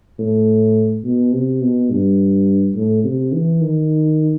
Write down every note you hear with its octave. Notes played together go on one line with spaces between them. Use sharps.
A2
B2
C3
B2
G2
A2
C3
E3
D#3